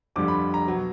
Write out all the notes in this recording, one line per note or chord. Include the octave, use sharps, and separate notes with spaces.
F2 D3 G3 D6
B5
A#5
B2 F#3